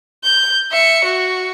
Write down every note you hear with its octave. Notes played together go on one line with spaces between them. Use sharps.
G6
E5 C#7
F#4